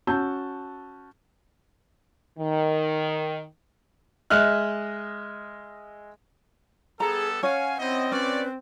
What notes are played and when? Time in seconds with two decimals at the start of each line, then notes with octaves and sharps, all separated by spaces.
0.07 C#4 F#4 A5 E6 G6
2.39 D#3
4.30 G#3 D#5 E5 F6 F#6
7.00 G3 B3 G#4 A4 A#5
7.43 C#4 C#5 F5 F#5 G#5
7.79 C4 E4 C5 D#5
8.12 C#4 F4 B4 C#5 D5